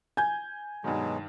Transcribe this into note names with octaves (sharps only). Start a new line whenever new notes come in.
G#5 G6 G#6
G2 B2 D#3 F#3 G#3